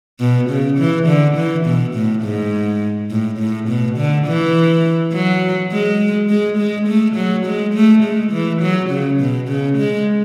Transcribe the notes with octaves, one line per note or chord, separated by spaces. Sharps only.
B2
C#3
E3
D3
E3
B2
A2
G#2
A2
A2
B2
D3
E3
F#3
G#3
G#3
G#3
A3
F#3
G#3
A3
G#3
E3
F#3
C#3
B2
C#3
G#3